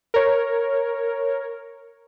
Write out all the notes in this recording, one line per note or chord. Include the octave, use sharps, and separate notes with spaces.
A#4 C#5